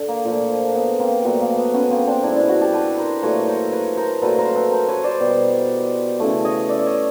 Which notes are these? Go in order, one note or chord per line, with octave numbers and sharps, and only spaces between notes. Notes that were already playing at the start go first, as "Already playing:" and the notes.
Already playing: D3
A#3
A#2 F3 A3
B3
A#3 C4
A#2 F#3 A3 B3
A#3
B3
B3 C#4
A#3 C4
C4 D4
B2 G#3 D4 E4
D4 E4
E4 F#4
G4 A4
A4 B4
A#4 C5
A#2 F#3 A3 B4 C#5
A#4 C5
B4 C#5
A#4 C5
A#2 F#3 A3 A4 B4
A#4 C5
A4 B4
A#4 C5
B4 C#5
C5 D5
B2 G3
C#3 E3 A3
C#5 D#5
D5 E5
D5
C#5 D#5